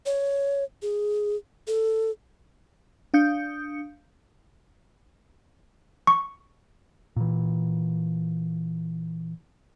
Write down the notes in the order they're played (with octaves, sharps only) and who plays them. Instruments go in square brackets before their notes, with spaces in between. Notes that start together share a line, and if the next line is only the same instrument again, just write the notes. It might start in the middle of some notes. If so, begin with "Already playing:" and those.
[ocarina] C#5
G#4
A4
[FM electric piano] D4 F5 D#6 G6 C#7
[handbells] C#6
[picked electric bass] A#2 E3